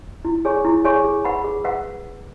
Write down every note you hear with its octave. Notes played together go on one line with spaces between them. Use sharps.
E4
G#4 C#5 G#5 C#6
E4
G#4 C#5 G#5 C#6
G#4
B4 F#5 B5
G#4
B4 F#5